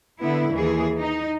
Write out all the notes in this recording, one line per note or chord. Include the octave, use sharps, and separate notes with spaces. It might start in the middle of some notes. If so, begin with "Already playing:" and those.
D3 B3 E4
D#2 E3 G#4
D#4